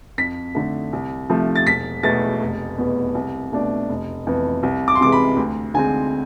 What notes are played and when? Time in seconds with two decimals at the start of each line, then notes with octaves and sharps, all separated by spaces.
0.18 F2 B6
0.55 D3 A3
0.93 C2
1.29 C3 F3 A3
1.56 A6
1.66 E1 B6
2.03 E2 B2 A3 A6
2.41 F1
2.78 E2 B2 B3
3.15 C2
3.52 B2 A3 D4
3.89 F1
4.27 F2 E3 B3
4.63 C2
4.88 D6
4.95 C6
5.01 C3 E3 G#3 D6
5.12 B5
5.37 D2
5.74 D3 G#3 C4 G#5